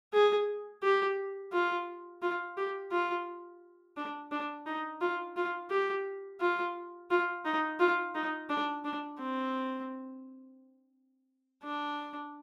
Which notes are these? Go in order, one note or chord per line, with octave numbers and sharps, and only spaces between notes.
G#4
G4
F4
F4
G4
F4
D4
D4
D#4
F4
F4
G4
F4
F4
D#4
F4
D#4
D4
D4
C4
D4